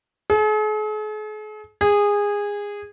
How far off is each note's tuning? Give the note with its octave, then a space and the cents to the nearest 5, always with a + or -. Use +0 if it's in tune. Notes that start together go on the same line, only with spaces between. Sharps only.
G#4 +45
G#4 -20